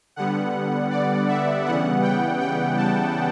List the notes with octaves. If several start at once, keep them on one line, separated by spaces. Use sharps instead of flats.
D3 G3 B3 F#5
D5
E5
C#3 E3 G3 B3 F#5
G5
G5
A5